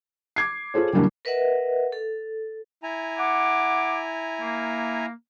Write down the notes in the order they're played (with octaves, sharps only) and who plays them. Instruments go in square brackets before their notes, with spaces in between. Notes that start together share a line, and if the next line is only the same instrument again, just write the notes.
[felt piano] D6 G#6 C7
F4 G#4 A4 C5 C#5
C#3 E3 F#3 G3 A#3 D4
[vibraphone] A#4 B4 D#5 E5 F#5
A4
[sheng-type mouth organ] E4 G#5 A#5
[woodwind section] F#5 D6
A#3